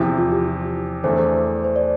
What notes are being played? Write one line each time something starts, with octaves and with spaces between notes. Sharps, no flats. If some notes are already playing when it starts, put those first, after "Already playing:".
Already playing: E2 C3 F3 E4
F4
G4
E4
E2 E3 A3 D4 C5
C5
D5